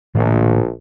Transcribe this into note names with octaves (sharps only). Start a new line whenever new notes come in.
A#1 A2 D#3 A#3